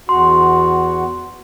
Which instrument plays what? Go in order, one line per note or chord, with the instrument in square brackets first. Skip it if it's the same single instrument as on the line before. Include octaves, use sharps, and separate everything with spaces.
[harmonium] E2 F#4 [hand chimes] C6